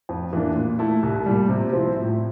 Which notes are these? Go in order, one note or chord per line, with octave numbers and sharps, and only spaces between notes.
F2
E3 A#3 D4
A#2
A3 E4 A4
C2
A#2 G3
C3
F3 C4 E4
A2